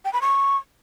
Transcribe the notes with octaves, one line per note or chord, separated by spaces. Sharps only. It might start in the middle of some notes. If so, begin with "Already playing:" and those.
G5
B5
C#6